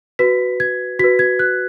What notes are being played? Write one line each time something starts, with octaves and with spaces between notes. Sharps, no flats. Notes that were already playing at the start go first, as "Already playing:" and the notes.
F#4 B4 B6
G#6
F#4 B4 B6
G#6
F#6